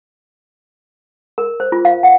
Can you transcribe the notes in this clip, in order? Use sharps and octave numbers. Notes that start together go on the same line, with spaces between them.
A#4
C5
F4
F5
F#5